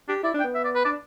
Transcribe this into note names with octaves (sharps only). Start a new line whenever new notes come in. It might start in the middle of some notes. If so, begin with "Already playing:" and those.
D4 G4
E4 D5
D4
G5
B3
E5
D5
B4
D4 D5